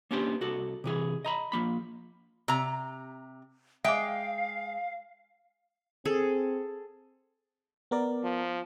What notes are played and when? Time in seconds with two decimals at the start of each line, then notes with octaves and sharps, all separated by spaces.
0.11 A#3 B3 C#4 D4 G4 C5
0.41 C2 F#4 A4
0.84 C3 E3 G#4
1.25 D#5 A#5 B5
1.52 F3 A#3 B5
2.48 C3 A#5
3.84 G#3 E5 F5 G5 D6
6.05 C4 G#4 A4
7.91 B3 A#4 D5
8.24 F3